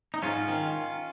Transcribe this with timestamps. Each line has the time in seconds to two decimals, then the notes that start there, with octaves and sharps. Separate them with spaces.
0.14 D#4
0.22 G#2 C#4 F4
0.48 D#3